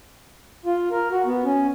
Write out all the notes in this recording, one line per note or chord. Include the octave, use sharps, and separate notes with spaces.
F4
A#4
F#4
B3
C#4